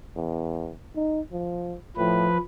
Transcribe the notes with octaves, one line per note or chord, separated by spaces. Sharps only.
E2
D#4
F3
A2 F3 B4